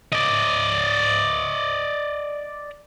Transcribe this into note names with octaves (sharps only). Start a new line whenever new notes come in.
D5 D#5